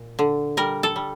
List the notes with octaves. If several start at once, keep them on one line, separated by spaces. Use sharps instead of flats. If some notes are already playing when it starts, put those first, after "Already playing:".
Already playing: A#2
D3
G3 A#4
A4
G3